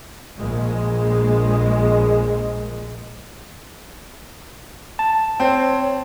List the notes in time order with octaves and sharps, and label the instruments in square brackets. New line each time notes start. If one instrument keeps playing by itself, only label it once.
[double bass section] A#1 G#3
[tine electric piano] A5
[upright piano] C4 [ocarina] C#5